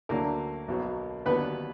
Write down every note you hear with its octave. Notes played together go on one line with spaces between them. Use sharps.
D2 D3 F#3 A#3 A#4
B1 B2 F#3
D#2 D3 F#3 B3 B4